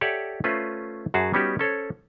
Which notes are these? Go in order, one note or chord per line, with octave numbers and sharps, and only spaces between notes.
G4 A4 C#5 D5 E5 F#5
A3 C#4 F4 B4 C5 E5
F#2 F#4 G#4 A5
G3 B3 C#4 D#4 F#4 G4
C#4 A4 C5 C#5